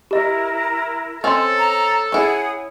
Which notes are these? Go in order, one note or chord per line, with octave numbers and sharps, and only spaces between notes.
E4 G4 A#4 D#5
C4 C#4 A4 D#5 C6
A#5
C#4 E4 G#4 F#5